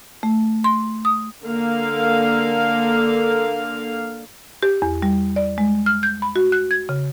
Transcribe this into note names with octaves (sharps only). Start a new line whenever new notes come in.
A3
C6
D#6
D3 A#3 F5
G4
E2
G3
D5
G#3
F6
G6
B5
F#4
F#6
G#6
C#3